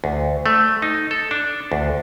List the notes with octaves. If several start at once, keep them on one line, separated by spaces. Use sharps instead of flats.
D2
A3
D#4
A4
D4
D2